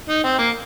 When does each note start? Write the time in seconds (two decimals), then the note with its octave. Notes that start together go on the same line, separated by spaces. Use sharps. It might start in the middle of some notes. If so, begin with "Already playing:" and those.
0.09 D#4
0.24 C4
0.39 A#3